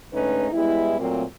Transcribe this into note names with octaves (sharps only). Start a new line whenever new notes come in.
G#2 D3 A3 C#4 D#4 B4
G3 G#3 B3 E4
A#2 F#3 A3 A#3 C4